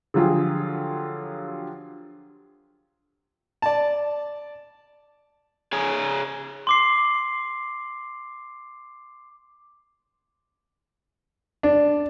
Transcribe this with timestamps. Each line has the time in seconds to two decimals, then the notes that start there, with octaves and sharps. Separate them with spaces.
0.14 D3 F3 F#3 F4 G4 G#4
3.62 D5 A5
5.73 G#4 C#5 G#5 A#5
6.67 C6 D6 C7
11.63 D4